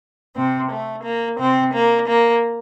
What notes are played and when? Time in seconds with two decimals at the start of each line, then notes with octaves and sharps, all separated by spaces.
0.36 C3 C4
0.70 A3
1.04 A#3
1.39 C3 C4
1.74 A#3
2.07 A#3